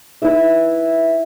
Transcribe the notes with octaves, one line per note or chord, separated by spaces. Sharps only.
E4 B4 E5